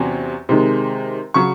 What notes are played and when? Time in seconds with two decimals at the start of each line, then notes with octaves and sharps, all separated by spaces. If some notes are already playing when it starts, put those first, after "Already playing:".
Already playing: E2 C3 F#3 C#4
0.49 C3 D#3 G#3
1.34 C#3 F#3 C#6